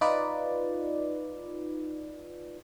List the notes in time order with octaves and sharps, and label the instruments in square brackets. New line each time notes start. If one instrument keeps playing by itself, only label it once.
[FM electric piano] D#4 F4 B4 D5